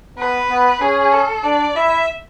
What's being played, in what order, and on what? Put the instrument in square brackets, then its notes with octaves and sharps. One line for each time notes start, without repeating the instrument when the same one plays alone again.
[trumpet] B3 [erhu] B4
[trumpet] B3
[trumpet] C#4 [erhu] G#4
[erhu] A4
[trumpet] D4 [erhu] D5
[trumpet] E4 [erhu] E5